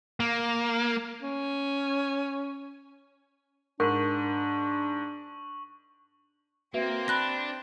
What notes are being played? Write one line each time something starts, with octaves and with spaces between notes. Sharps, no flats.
A#3
C#4
G#2 D4 A#4 C#6 F#7
A#3 C4 F#4 B4 E5
D4 B5 F#6 A#6